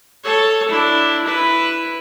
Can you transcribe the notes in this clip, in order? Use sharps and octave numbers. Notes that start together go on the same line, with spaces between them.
A4 C#5
D4 E4
E4 B4